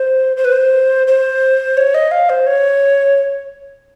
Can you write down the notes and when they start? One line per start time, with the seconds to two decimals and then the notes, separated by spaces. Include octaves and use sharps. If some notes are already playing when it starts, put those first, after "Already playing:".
Already playing: C5
0.37 C5
0.45 B4
0.52 C5
1.07 C5
1.77 C#5
1.94 D#5
2.11 F5
2.30 C5
2.47 C#5